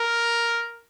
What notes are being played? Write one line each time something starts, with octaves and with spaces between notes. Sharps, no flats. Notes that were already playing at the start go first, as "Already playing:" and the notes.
Already playing: A#4